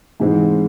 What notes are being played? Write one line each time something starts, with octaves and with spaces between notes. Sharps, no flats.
G#2 E3 G#3 C4